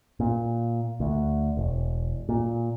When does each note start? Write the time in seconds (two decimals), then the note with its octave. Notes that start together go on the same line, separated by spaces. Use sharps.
0.20 A#2
1.00 D2
1.57 E1
2.29 A#2